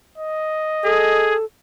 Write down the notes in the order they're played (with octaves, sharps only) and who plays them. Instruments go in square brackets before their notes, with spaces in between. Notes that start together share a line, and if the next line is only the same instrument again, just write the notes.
[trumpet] D#5
[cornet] G#4 [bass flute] A4